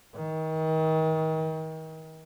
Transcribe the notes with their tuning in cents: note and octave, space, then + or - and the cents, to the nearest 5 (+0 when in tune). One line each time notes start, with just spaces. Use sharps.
D#3 +35